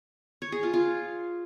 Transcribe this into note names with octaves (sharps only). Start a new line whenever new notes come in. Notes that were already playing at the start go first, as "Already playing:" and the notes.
C#5
G#4
F4
F4